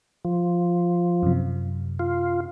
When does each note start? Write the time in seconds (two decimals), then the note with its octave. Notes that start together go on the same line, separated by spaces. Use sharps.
0.25 F3
1.23 F#2 C3
1.99 F4